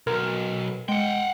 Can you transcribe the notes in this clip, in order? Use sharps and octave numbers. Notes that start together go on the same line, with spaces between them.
B1 A#4
G#3 F#5 G5